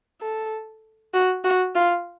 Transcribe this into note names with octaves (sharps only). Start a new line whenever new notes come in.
A4
F#4
F#4
F4